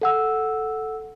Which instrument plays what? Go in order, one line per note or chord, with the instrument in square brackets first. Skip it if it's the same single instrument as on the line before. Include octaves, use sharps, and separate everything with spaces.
[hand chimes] A4 F#5 E6